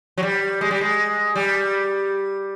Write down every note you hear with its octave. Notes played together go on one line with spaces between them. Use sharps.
F#3
G3
G#3
G3
G#3
G3